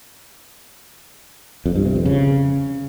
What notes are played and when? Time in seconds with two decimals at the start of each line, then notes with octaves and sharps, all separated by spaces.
1.66 F2
1.76 G2
1.86 C3
1.96 F2
2.06 C#3